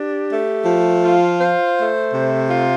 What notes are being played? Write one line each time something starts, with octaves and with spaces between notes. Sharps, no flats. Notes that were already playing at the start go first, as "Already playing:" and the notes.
Already playing: D4 G4
A3
F3
F4
C5
A3
C3
F4